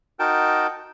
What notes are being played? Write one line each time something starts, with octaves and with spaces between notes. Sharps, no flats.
D#4 F#4 A#4 G5 A5